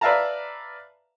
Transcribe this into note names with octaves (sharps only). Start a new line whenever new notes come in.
B4 D5 E5 F5 A5 A#5